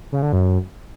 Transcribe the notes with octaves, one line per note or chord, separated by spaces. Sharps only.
C#3
D3
F#2